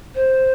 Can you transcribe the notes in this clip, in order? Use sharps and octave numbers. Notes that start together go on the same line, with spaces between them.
C5